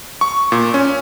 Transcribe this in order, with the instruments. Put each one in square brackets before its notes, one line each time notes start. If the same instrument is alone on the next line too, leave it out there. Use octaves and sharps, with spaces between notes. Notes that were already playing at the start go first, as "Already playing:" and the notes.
[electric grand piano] C#6
A#2
C#4